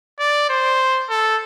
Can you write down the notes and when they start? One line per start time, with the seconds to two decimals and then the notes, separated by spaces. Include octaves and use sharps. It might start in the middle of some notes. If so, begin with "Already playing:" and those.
0.20 D5
0.49 C5
1.10 A4